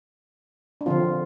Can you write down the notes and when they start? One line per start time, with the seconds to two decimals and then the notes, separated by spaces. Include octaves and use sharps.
0.81 D4
0.86 D3 F3 C4 F4